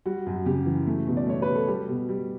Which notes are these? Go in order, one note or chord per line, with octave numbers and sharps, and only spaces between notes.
G3 F#4
F#2
C#3 G4
E3
A3
B2
D5
A3 C#5
B4
B2
A4
G3 G4
B2
G3